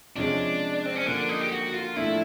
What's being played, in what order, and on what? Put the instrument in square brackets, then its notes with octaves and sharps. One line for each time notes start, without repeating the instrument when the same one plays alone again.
[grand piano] C3 F3 G#3 C#4 [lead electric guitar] D4
[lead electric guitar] C4
C#4
[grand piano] D3 F3 A#3 [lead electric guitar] D4
[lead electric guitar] D#4
G4
F#4
F4
[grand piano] A2 F3 A3 D4 [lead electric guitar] E4